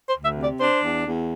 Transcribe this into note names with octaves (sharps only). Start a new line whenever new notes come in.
C5
D2
E5
C3
D5
D4 C5
E2
E2